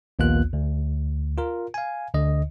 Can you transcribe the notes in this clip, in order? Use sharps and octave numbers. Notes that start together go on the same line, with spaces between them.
A#1 D#2 A#3 B3 F4 F#6
D2
F4 A#4
F5 G#5
D2 D3 D#5